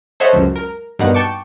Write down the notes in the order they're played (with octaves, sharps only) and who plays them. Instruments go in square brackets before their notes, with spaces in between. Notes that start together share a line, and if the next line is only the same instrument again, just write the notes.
[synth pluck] A4 C5 C#5 D#5 E5 F#5
C#2 F#2
A#4
G2 B2 A#3 D#4 F#5
G5 A5 C#6 D6